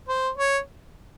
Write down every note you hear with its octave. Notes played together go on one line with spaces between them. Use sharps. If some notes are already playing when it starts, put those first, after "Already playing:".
C5
C#5